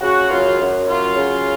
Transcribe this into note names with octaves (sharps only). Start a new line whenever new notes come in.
C#3 F#4
F#2 F4
F#2
F#3 F4
C#3